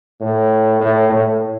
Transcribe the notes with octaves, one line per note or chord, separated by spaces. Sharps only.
A2
A2
A2